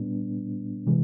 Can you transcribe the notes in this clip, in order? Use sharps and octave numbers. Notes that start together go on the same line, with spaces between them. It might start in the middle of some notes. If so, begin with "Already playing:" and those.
Already playing: A#2 G3 B3 D4
C3 E3 G#3